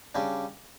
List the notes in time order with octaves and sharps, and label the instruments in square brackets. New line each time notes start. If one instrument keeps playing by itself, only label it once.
[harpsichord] C#3 G3 D4